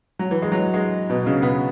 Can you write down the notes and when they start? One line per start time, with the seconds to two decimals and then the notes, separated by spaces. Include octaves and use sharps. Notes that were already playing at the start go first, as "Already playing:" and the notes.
0.19 F#3
0.31 E3
0.42 G#3
0.52 F#3
0.74 G#3
1.10 B2
1.26 C#3
1.42 B3